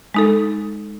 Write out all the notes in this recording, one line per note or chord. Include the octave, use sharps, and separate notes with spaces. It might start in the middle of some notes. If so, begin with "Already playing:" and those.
G#3 D#4 A4